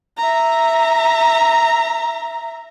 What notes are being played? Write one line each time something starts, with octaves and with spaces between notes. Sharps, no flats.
E5 A#5